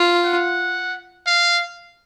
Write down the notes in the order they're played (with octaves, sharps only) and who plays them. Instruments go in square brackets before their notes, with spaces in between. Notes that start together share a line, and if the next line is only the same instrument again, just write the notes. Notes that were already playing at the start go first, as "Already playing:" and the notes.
Already playing: [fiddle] F4
[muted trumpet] F#5
F5